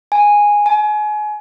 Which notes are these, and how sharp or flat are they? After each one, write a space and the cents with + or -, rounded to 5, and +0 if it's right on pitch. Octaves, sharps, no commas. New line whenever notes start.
G#5 -5
G#5 +30